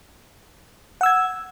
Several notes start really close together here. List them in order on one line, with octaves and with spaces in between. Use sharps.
F#5 E6 G#6